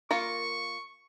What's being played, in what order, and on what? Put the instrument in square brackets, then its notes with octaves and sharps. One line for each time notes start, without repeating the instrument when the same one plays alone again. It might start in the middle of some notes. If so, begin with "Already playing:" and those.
[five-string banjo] A#3 F4 A#4 [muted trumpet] C#6